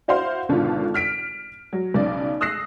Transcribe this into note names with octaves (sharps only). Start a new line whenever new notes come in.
E4 F#4 C5 F5 F#5 C6
G#1 B2 D3 F4 A4
F6 B6 D7
F#3
B1 C#3 D5
D#6 E6 F#6 A#6 C7